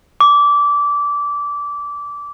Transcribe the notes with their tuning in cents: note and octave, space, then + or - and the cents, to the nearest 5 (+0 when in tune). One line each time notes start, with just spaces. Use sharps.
D6 -20